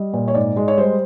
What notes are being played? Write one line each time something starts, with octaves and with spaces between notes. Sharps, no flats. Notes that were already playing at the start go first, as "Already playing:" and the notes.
Already playing: G3 D#5
A#2
C#5
G#2 D5
G#3
C#5
G3 C5